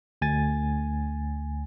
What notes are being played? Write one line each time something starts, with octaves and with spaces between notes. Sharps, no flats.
D2 G#5 A6